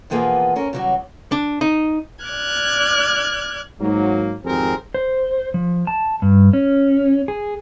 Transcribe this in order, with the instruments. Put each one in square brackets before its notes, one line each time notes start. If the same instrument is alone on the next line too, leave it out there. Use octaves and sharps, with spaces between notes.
[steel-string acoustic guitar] B2 E3 F3 A#3 B3 G#4
C4 C#4 A#4
C#3 E3 F#3 G3 F#4
[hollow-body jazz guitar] D4
D#4
[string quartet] D5 F6 F#6 G#6
[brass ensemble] G#2 F#3 A#3
G#1 F2 C4 G4 G#4 A#4
[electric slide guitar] C5
F3
A5
G2
C#4
G#4